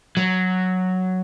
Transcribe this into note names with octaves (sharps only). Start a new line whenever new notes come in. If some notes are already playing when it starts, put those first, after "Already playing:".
F#3